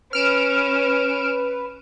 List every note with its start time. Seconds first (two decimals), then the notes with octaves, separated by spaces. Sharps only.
0.13 C#4 B4 F6 D7 E7